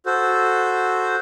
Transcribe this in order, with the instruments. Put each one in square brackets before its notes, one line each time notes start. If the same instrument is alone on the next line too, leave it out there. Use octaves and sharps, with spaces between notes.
[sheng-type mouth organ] F#4 A4 C5